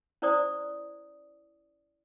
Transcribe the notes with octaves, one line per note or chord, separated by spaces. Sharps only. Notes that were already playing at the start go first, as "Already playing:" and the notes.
C#4 E4 C5 D5 D#6